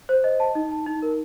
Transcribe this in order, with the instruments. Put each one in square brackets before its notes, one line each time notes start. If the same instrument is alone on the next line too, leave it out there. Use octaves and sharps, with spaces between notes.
[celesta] C5
D#5
A5
D#4
A5
D#4
A#4